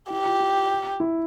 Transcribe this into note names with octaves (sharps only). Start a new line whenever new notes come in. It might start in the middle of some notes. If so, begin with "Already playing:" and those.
E4 G4
F4
F4
E4